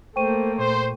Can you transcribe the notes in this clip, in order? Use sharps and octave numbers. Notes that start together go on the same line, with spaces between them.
A3 A#3 C5 G5 C#6 D#7
A#2 C5